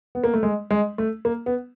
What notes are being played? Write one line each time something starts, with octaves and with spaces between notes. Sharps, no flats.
B3
A#3
A3
G#3
G#3
A3
A#3
B3